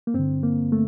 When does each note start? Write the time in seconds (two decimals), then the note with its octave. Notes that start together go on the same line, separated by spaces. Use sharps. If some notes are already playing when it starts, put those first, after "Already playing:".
0.07 A#3
0.14 G2 D3 C4
0.43 A#3
0.72 A3